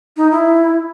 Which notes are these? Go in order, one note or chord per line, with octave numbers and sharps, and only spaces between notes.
D#4
E4